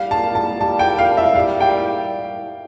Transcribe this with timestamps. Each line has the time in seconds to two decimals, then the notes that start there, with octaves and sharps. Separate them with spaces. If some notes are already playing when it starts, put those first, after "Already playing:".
Already playing: G3 F5
0.11 A5
0.35 A5
0.61 G3 A5
0.79 G5
0.98 F5
1.17 E5
1.35 G3 F5
1.60 G5